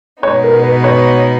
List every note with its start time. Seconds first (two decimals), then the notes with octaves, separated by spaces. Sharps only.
0.23 B2 G#3 B3 D#4 C#5
0.44 A#4
0.63 B4
0.84 C#5